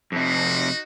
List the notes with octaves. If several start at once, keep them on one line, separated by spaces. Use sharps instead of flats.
F2 C3 D#4 F#4